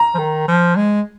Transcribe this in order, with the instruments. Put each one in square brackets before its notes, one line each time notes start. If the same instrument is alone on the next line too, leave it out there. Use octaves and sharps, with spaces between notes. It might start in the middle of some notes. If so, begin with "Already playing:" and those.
Already playing: [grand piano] A#5
[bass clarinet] F3
D#3
F3
G#3